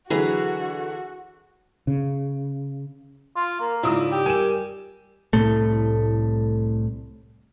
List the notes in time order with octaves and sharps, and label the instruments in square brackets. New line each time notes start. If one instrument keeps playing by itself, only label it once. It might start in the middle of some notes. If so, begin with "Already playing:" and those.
[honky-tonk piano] D3 E3 F#3 [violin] F#4 [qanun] G#4 B4 A#5
[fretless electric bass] C#3
[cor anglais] F4
[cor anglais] A#3 [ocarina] A#4
[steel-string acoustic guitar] G#2 C#3 D5 [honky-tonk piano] E4 D#6 E6 [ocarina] F4
[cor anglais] G4
[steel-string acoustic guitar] G3 [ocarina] A#4 [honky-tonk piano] G#5 E7
[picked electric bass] C2 A2 A3